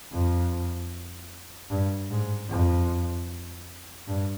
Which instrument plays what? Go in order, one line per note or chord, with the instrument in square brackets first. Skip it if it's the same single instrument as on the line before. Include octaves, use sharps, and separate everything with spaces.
[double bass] F2
G2
G#2
F2
G2